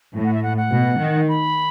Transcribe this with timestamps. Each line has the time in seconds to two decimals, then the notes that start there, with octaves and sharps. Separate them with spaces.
0.14 A2
0.24 F#5
0.34 E5
0.43 F#5
0.57 F#5
0.71 B2
1.00 D#3
1.29 B5